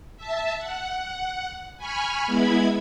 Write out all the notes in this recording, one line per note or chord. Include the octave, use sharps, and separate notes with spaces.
E5 A5
F#5
G#5 B5 C#6 F6
G#3 B3 E4 B5 G#6